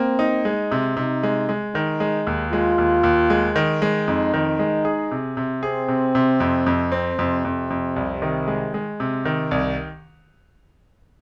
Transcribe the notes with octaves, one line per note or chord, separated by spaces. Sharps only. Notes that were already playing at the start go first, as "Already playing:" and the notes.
Already playing: A#3 C4
D#4
G#3
C3
C3 D#4
G#3
G#3
D#3 D#4
G#3
D#2
G#3 F4
D#2
D#2
G#3
D#3
G#3
F2 D#4
D#3
G#3
G#4
C3
C3
C4 G#4
C3
C3
F2
F2
C4
F2 C3
F2
F2
C2
D#3
G#3
G#3
C3
D#3
C2